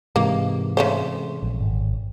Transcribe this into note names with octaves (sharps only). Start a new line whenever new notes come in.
G#2 C3 E3 G#3 A#3
C#3 A3 C5
A#1
G#1